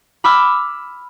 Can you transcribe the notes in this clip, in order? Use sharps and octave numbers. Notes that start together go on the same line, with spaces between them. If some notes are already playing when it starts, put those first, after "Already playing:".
B5 D6 E6 F6